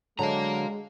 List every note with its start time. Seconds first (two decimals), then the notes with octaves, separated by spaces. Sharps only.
0.19 D3 F#3 G#3 F5 A#5